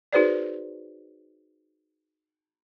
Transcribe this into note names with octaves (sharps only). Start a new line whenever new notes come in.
D#4 F#4 G#4 B4 C5 D5